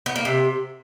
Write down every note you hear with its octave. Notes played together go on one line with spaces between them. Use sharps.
B3
A#3
C3